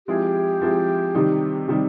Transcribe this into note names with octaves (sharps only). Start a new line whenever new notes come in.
F3 G#3 C4 E4 G4 G#4
F3 G#3 C4 E4 G#4
C3 D#3 G3 C4 D#4
C3 D#3 G3 C4 D#4